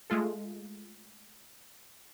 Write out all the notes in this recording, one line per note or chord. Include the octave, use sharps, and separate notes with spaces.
G#3 A3 F4 A4